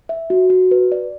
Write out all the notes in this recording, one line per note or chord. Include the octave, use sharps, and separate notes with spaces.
E5
F#4
F#4
B4
D5